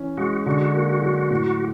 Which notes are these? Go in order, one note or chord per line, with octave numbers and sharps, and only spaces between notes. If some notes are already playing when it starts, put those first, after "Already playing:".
Already playing: E3 C#4
G#3 F#4
D3 F#4
A#3
F#3
A2